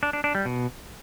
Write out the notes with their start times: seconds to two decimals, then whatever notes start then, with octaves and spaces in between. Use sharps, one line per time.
0.03 D4
0.13 D4
0.24 D4
0.35 G3
0.45 B2